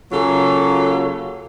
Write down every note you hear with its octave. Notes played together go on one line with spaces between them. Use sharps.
C#3 F#3 A#3 F4 A4